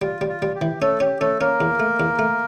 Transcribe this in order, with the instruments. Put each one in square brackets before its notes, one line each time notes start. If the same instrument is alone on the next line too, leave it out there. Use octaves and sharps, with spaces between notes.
[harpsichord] G3 [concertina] F4
[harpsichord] G3
[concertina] F4
[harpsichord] G3
[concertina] G4
[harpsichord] E3
[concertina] A3 A4 [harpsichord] C#4
[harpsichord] C#4 [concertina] G4
[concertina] A3 A4 [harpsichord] C#4
[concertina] A#3 A#4 [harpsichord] C#4
[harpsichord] E2
A3
E2
A3